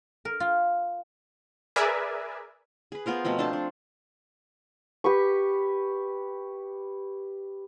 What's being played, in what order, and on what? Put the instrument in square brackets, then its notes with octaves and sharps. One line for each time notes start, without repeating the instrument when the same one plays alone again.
[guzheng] A#4
F4
[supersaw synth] G#4 A#4 B4 D5 E5 G#5
[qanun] G#4 B4
B3 F4 A#4 C5
B2 F3 A3 C4
D4 A4 C5 A5
D4
[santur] G4 B4 C#6